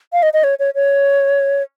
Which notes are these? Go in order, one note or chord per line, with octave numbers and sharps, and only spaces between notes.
F5
D#5
D#5
C#5
C#5
C#5